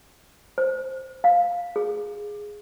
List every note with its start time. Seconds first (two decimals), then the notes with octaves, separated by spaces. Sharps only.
0.58 C5
1.24 F5
1.76 G#4